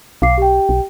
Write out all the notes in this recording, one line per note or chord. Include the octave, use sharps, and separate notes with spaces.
B1 F5 D6 C7
G4 G5
B1